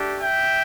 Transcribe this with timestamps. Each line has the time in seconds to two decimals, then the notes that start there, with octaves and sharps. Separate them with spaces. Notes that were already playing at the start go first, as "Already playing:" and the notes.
Already playing: A3 D4 G4
0.21 E5 G5